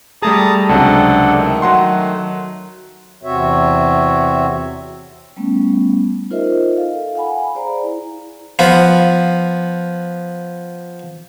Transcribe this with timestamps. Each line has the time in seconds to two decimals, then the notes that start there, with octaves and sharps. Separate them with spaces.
0.22 G3 A3 G#4 A5 A#5 D#6
0.69 C#2 C3 F#3 D4 A4 F#5
1.37 D#3 A3
1.62 F#3 F#5 C6
3.23 E2 C3 C4 F#4 C#5 E5
5.36 G3 A3 B3 C#4
6.30 D#4 F4 A#4 C5 D#5 E5
6.77 A4 F5
7.15 F5 F#5 G#5 B5
7.55 G#4 C5 D5 A#5
7.83 E4
8.59 F3 B3